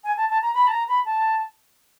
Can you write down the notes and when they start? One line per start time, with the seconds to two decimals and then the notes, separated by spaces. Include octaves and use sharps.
0.04 G#5
0.17 A5
0.29 A5
0.42 A#5
0.54 B5
0.67 A5
0.72 A#5
0.88 B5
1.05 A5